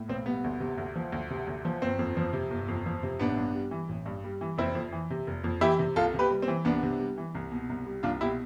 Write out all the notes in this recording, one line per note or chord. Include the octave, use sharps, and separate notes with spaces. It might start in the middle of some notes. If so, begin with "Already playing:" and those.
Already playing: A2
B1 C4
G3 B3
D2
C3
D2
F3
D2
C3
D2
F3
G1 C4
F2
F3
C3
G1
F2
F3
C3
A1 B3 D4
G2
G3
E3
A1
G2
G3
E3
F1 C4 E4
F2
E3
C3
F1
F2
E3 E4 G4
C3
C2 F4 A4
C3
G4 B4
G3
C4
E3
C2 B3 D4
C3
G3
E3
C2
B2
C2
G3
C2 D4 F4
B2 E4 G4